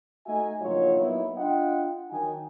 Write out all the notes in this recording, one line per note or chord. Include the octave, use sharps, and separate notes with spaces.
A3 D#4 F#4 D#5 E5 G#5
A#1 C#3 F#3 D#4 F4 C#5
F#3 A#3 B3 D#4 E4
D4 F4 D#5 F#5 G5
D#3 F#3 D#4 F#4 G5 G#5